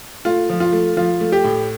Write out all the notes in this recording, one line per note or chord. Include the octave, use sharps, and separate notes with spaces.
A3 F4
F3
F4
A3
F3 F4
A3
G4
A2